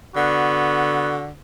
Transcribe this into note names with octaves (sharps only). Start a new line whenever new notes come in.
D3 B3 F#4